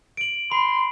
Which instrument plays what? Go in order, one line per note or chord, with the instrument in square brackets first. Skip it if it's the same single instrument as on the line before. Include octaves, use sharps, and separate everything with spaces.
[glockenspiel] D7 F#7
[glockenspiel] B5 [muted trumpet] C6